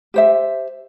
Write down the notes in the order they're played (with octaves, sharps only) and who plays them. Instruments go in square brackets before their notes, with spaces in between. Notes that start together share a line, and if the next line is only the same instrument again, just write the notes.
[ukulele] G4 C5 E5